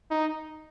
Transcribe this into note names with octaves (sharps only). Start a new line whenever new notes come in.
D#4